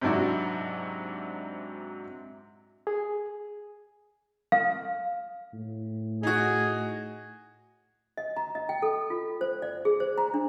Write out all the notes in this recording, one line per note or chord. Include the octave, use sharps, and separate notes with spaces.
G#2 C3 F#3 D4 E4 F#4
G#4
F5
A2
D#4 F#4 G#4
D#5
A#5
D#5
G5
A4
F4
C5
D5
G#4
C5
A#5
D4